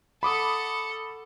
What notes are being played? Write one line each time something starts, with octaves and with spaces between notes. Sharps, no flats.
A4 F#5 B5 D6 D#6